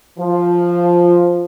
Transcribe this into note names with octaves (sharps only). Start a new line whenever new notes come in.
F3